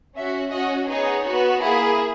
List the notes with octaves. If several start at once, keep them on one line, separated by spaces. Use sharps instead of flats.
C#4 F#4 E5
C#4 F#4 D#5
B3 D#4 G#4 C#5
B3 F#4
A#3 E4 G#4